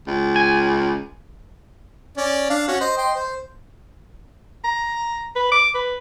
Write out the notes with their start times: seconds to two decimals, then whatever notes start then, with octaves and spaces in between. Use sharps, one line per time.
0.07 C#2
0.36 G#5
2.17 C#4 D5
2.49 D4 F5
2.68 C#4 F#4
2.81 C5 D#5
2.97 D#5 G5 C6
3.15 C5
4.64 A#5
5.35 B4
5.51 D6
5.75 B4